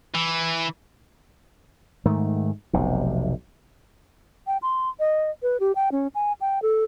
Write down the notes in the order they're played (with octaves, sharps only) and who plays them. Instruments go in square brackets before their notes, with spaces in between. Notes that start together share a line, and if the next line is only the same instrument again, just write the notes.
[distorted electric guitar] E3
[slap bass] G#2 D#3 A3
F1 B1 C3
[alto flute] G5
C6
D#5
B4
G4
G5
C#4
G#5
G5
A4